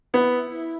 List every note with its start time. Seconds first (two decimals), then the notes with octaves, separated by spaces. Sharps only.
0.14 B3 E4
0.33 E4
0.52 E4